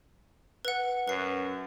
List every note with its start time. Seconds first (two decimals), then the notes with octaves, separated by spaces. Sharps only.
0.65 B4 F#5
1.08 F#2 B4 C7